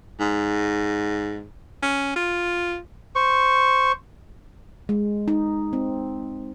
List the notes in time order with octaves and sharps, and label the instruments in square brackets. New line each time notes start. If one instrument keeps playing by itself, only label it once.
[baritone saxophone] G#2
C#4
F4
[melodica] C5 C#6
[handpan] G#3
D#4
C4